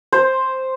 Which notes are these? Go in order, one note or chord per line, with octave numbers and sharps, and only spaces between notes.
C5